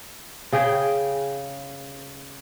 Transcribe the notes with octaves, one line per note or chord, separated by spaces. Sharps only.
C#3 G#4 G5